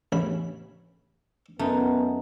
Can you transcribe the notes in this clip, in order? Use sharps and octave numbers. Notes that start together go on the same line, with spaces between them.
A1 C#3 B5
F#2 A3 B3 D#4